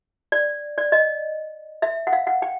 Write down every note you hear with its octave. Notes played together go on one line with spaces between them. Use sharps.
D5
D5
D#5
E5
F#5
F5
F#5
G5